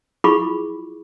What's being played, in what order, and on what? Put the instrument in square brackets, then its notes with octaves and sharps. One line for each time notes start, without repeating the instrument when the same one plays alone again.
[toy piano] E4 F4 G#4 B5 C#6 D6